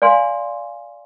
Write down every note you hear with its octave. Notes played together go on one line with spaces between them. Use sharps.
D5 F5 G#5 C6